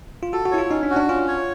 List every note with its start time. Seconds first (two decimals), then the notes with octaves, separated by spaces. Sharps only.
0.23 F4
0.33 F#4 A4
0.46 F#4
0.51 E4 C#5
0.58 F4
0.71 C#4 D#4
0.83 D4
0.90 F#4
0.96 D4
1.08 C#4 F4
1.28 C#5